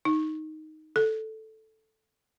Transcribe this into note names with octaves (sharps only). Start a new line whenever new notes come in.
D#4
A4